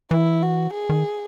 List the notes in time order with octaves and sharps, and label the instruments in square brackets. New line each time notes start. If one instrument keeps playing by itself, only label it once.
[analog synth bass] E3 [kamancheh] E4
[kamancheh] F#4
G#4
[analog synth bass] D#3